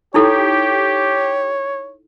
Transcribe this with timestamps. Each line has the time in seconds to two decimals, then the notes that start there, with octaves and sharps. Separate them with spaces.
0.14 D#4 E4 G4 A4 C#5